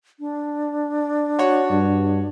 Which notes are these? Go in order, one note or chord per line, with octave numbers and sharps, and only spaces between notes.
D4
F#4 C#5
G2